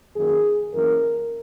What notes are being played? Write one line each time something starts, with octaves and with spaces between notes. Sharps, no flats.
F#2 D#3 A#3 C#4 G#4
F#2 E3 A#3 C#4 A#4